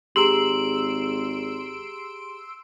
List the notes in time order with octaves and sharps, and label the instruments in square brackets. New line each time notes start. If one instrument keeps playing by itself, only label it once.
[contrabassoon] G#1 [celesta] G4 G#4 A#5 [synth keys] C6 E6 D7 [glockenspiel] F#7